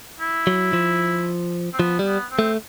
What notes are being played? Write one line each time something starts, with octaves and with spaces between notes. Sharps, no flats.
E4
F#3
F3
C4
F3 B3
G3
B3
C4
A3